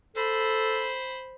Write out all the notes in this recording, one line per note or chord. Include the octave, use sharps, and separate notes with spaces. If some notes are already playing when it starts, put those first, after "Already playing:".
A4 C5 B5